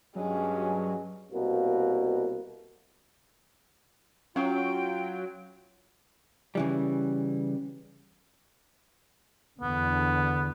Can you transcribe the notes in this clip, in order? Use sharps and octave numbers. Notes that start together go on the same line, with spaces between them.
G2 F#3 G#3 C#4
C2 B2 A#3
F#3 C#4 F4 F5 G5
C#3 E3 G3
E2 D3 B3